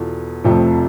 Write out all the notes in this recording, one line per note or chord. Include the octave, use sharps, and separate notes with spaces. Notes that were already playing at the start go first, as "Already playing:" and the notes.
Already playing: E2 B2 B3 F4 A4
F1 F2 C3 F3 A3